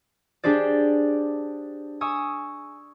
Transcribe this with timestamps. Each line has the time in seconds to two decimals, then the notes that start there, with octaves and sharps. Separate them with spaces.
0.44 D4 G4 G#4 C5 D5
2.01 G#5 C#6 D#6 E6